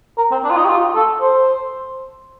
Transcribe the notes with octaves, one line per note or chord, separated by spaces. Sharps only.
A#4
C4
D4
F4
D#4
G4
F4
A4
C5